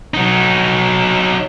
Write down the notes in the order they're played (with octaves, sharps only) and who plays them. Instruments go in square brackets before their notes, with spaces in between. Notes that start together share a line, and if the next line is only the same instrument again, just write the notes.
[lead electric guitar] F#3 D#4